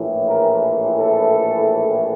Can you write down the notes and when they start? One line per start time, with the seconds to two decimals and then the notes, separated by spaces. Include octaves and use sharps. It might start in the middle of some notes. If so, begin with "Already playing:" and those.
Already playing: A#1 A2 E3
0.26 A#4
0.97 A4